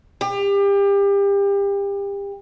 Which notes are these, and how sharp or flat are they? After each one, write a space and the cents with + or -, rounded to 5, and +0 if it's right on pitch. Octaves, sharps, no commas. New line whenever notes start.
G4 +30